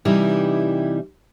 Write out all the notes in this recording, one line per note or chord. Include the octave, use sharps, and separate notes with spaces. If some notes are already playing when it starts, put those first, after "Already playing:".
C3 E3 G3 D#4 E4